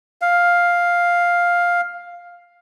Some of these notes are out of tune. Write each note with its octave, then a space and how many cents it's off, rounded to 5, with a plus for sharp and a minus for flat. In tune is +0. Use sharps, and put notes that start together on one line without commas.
F5 +5